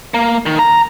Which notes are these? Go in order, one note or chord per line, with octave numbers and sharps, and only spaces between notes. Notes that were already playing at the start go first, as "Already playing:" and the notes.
A#3
D#3
A#5